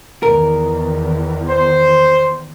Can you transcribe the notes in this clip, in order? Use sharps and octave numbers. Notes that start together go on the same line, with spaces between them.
E2 D#3 A#4
C5